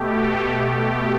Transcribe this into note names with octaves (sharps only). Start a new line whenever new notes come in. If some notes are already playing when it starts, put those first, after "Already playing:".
Already playing: B2 A3 G4
G4